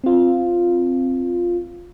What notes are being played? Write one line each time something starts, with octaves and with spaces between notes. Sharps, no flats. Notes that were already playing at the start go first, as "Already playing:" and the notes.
C4 F4